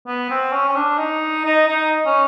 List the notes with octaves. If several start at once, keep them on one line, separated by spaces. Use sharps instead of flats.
B3
C4
C#4
C#4
D4
D#4
D#4
D#4
C#4